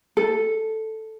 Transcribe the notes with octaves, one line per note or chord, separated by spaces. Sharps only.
A4